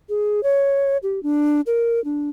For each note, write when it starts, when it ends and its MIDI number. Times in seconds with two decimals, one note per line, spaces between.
0.09 0.43 68
0.43 0.97 73
1.03 1.22 67
1.23 1.61 62
1.66 2.03 70
2.05 2.30 62